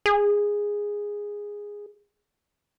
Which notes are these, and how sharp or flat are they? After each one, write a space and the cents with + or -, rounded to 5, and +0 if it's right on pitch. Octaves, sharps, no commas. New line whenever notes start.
G#4 -10